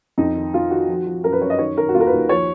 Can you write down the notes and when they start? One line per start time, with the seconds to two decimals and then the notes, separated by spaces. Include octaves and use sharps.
0.18 F2 D#4
0.36 D#3
0.54 D#3 F4
0.71 D#3 F#4
0.88 F3
1.07 F3
1.24 F#2 A#4
1.32 B4
1.42 F#2 C#5
1.50 D#5
1.59 D#3 C#5
1.77 D#3 A#4
1.89 F#4
1.94 D#2 F4
2.00 A#4
2.07 B4
2.13 D#2
2.29 F3 C#5